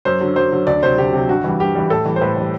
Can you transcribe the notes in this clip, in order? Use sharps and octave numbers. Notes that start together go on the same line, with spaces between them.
F#2 C5
D3 F#3
F#2 C5
D3 F#3
D2 D5
C3 F#3 C5
D2 G4
C3 F#3
G2 F#4
E3 G3
G2 G4
E3 G3
A2 A4
E3 G3
C5
A2 B4
E3 G3